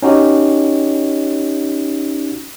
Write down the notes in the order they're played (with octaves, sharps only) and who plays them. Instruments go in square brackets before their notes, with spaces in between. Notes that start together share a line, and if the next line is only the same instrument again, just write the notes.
[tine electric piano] C#4 D#4 F#4 G4